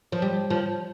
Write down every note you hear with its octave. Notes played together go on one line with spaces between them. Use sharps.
F3
G3
F3